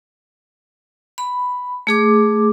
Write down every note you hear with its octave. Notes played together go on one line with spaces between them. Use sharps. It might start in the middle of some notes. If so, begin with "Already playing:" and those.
B5
A3 G#4 D6